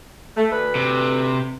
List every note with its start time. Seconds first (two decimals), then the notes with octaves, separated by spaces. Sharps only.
0.37 A3
0.51 D2 D3 B4
0.75 C3